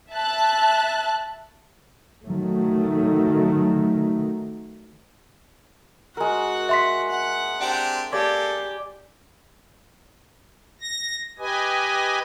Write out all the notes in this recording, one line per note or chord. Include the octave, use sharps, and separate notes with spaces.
E5 A5 F#6
D#3 F#3 A3
G#3 F#4 A#4 F#5
E5 C6 B6
F#5
C4 D4 G4
A#3 G4 A4 D5 G#5
A#6
G4 B4 D#5 G#5